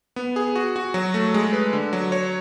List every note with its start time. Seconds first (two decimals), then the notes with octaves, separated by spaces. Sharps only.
0.16 B3
0.36 G#4
0.56 F#4
0.76 F#4
0.94 F#3
1.14 A3
1.34 G#3
1.53 B4
1.73 D3
1.93 F#3
2.12 C#5